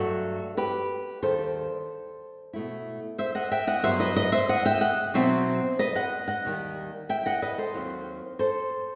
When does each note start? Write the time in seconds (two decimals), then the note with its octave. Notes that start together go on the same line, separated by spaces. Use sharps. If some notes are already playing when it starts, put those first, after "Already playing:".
Already playing: G2 F#3 A3 F#4 A4
0.57 G4 B4
1.22 D#2 D#3 G3 A4 C5
2.53 B2 A3 E4
3.18 C5 E5
3.35 D#5 F#5
3.51 E5 G5
3.67 D#5 F#5
3.83 G2 F#3 B3 D#4 C5 E5
4.00 B4 D#5
4.16 B4 D#5
4.32 C5 E5
4.49 D#5 F#5
4.66 E5 G5
4.81 D#5 F#5
5.14 B2 F#3 C4 D#4 C5 E5
5.79 B4 D#5
5.95 D#5 F#5
6.28 D#5 F#5
6.45 D#2 D#3 G3
7.09 E5 G5
7.26 D#5 F#5
7.42 B4 D#5
7.58 A4 C5
7.74 D#2 D#3 F#3 C4
8.39 A4 C5